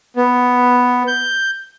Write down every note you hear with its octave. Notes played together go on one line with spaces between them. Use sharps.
B3
G6